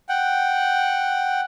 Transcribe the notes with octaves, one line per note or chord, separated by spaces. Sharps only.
F#5 G5